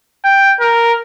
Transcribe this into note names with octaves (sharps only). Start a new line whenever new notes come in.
G5
A#4